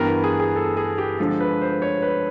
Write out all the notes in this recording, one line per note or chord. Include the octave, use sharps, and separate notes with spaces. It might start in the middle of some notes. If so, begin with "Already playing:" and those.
Already playing: G2 E3 G3 B3 A#4
G#4
G#4
A4
G#4
G4
D3 F3 G#3 A4
B4
C5
C#5
B4